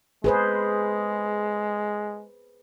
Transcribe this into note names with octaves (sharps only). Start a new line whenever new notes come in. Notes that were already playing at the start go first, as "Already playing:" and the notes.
G#3 G#4 B4 C5